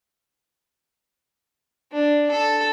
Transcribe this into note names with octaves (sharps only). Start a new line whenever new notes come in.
D4
A4